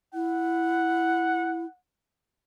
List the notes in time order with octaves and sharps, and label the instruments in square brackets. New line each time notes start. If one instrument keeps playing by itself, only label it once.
[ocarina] E4 [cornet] F#5